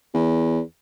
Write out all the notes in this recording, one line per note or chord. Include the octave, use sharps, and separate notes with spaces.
E2